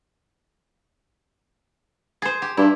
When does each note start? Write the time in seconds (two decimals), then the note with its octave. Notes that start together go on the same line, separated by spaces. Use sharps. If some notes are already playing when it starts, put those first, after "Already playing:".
2.22 G#4 C5
2.42 G4
2.57 G2 E4